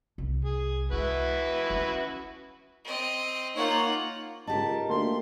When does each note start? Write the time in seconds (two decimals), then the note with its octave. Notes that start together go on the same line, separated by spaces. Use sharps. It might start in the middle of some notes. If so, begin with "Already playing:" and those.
0.18 C2
0.44 G#4
0.92 G#3 E4 F#4 B4
1.70 C#4
2.84 C4 D#5
3.56 A#3 D#4 F4 C#5 F#5
4.47 C#2 D#4 G4 A#4 A5
4.90 D2 A#3 C6